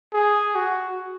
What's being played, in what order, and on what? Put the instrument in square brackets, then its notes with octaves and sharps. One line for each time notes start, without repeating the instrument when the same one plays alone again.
[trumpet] G#4
F#4